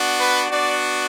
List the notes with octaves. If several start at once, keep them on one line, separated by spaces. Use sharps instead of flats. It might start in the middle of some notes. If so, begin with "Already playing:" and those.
Already playing: B3 D4 F#4
B4
B3 D4 F#4 D5